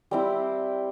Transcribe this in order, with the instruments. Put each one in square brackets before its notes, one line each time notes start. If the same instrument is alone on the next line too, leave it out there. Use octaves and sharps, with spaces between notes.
[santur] G3 C4 E4 G5